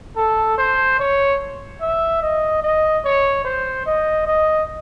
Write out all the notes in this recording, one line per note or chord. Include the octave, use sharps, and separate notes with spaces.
A4
C5
C#5
E5
D#5
D#5
C#5
C5
D#5
D#5